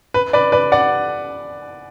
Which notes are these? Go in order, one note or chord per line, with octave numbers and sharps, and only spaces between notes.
B4
B4 D5
B4 D5
D5 F#5